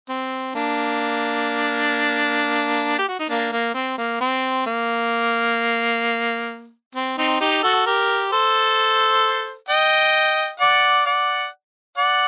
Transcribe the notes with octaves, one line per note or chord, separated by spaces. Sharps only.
C4
A#3 D4
G4
F#4
D#4
A#3 D4
A#3
C4
A#3
C4
A#3
C4
C4 D#4
D#4 G4
F#4 A4
G4 A#4
A4 C5
D#5 G5
D5 F#5
D5 F#5
D5 F#5